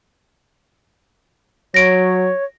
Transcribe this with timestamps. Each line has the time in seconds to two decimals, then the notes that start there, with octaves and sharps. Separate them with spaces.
1.74 F#3 C#5 A#6 D7